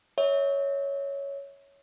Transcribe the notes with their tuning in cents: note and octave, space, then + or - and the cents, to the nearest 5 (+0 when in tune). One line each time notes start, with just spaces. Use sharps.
C#5 +5 E5 -30